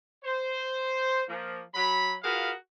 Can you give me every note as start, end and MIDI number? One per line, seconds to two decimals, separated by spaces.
0.24 1.23 72
1.28 1.61 53
1.28 1.61 58
1.75 2.15 54
1.75 2.15 83
2.23 2.52 65
2.23 2.52 66
2.23 2.52 68
2.23 2.52 70
2.23 2.52 71
2.23 2.52 77